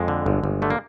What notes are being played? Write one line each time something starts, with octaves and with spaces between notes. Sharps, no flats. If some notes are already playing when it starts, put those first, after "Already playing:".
Already playing: F2 G#3
D3
G1
G1
D3 A3
A#3